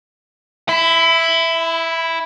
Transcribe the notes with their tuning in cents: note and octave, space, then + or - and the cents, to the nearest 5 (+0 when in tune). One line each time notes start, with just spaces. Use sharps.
E4 +0 B5 +30